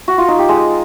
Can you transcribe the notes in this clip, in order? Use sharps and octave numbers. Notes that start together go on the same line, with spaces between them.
F#4
F4
D#4
G4
G#3